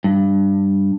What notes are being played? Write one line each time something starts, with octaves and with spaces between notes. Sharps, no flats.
G2